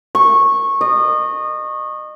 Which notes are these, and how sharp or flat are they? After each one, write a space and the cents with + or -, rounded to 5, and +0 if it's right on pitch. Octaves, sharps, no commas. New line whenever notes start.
C#6 -15
D#5 -30